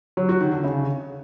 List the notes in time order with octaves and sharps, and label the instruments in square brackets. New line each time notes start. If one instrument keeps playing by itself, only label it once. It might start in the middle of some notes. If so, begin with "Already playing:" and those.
[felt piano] F#3
F#4
D#3
D3
C#3